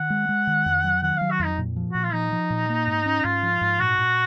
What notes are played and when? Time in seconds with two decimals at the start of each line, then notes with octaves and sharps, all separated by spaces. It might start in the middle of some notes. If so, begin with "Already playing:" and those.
Already playing: D#3 F#5
0.10 G#3
0.29 G#3
0.47 D#3
0.66 F2
0.84 F#3
1.02 D#3 F#5
1.17 F#3 F5
1.31 F#4
1.39 F2 D#4
1.58 A#2
1.76 F3
1.92 A#2 F#4
2.03 F4
2.13 F3 D#4
2.32 F3
2.50 A#2
2.69 A#3
2.87 G#2
3.06 C#4
3.24 G#2 F4
3.43 F3
3.61 G#2
3.79 A#2 F#4
3.98 A#2